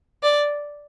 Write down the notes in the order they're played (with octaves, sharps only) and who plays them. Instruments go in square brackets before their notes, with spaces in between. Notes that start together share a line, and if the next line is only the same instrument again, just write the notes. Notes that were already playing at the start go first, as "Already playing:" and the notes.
[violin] D5